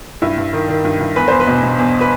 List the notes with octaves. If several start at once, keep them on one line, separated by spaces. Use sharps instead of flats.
G2 E4
G2
D#3
D#3
G2
G2
E2 B4
E2 C5
B4
B2
B2
E2
B4